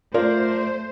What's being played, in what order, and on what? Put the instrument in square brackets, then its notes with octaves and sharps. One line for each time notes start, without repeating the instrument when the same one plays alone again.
[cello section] A3 C5 [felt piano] F4 A#4 D5